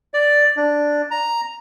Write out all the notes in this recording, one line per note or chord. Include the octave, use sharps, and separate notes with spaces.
D5
D4
A#5